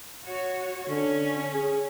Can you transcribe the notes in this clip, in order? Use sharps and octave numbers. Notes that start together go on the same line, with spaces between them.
F#4 C#5
D3 C#4
G#4